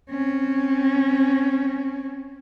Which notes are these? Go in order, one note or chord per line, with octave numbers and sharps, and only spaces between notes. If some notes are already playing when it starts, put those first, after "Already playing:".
C4 C#4